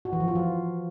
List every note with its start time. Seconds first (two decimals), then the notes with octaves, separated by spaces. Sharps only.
0.05 F#4
0.13 E3
0.20 F3
0.28 F4
0.35 F3